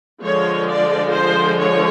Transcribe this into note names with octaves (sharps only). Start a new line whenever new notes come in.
D3 F3 G#3 C#5
D5
C5
C#5